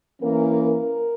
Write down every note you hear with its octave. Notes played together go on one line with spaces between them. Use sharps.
E3 A#3 C#4 A#4
A#4